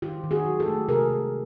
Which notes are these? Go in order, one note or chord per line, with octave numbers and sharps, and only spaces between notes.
D#3 F4 G4
D#3
F#4 G#4
F#3
G4 A4
A3
C3 G#4 A#4
A3